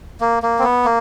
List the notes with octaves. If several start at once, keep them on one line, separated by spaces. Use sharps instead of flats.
A#3
A#3
C4
B3
A#3